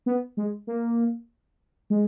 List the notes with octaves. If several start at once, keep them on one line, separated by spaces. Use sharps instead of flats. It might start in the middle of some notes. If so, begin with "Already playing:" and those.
B3
G#3
A#3
G#3